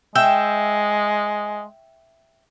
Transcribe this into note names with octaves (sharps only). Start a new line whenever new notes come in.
G#3 E5 G5